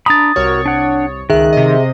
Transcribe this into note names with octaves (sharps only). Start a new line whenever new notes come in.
D4 A#5 B5 D#6 A6
C2 F#4 A#4 C#5
D4 F#5
C#2 D#3 G#4 E5 F#6
C3 D#5